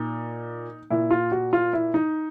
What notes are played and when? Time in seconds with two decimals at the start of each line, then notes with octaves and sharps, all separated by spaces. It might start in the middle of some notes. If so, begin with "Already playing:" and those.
Already playing: A#2 D#4
0.90 A#2 E4
1.11 F4
1.32 F#4
1.53 F4
1.73 E4
1.94 D#4